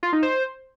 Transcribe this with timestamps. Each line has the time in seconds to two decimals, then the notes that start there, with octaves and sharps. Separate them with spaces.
0.03 F4
0.13 D#4
0.23 C5